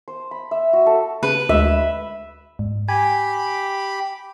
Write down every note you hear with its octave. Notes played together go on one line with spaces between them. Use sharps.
C5
B5
E5
F#4
A4
C#3 B4
D2 G#3 E5
G#2
G4 G#5 B5